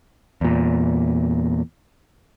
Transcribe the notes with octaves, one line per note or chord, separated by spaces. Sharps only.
E2 A#2